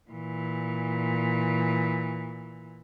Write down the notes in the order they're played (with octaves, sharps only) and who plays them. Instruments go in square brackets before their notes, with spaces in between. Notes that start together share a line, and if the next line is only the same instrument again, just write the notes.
[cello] A#2 E3